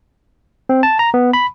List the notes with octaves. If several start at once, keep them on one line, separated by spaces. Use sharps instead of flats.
C4
A5
A#5
B3
B5